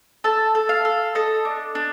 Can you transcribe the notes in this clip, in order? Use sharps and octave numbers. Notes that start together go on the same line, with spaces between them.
A4 A5
A4
F5
A4
A4 D#5
D4
D4